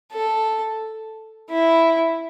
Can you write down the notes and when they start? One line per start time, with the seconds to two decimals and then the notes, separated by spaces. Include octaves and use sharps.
0.12 A4
1.50 E4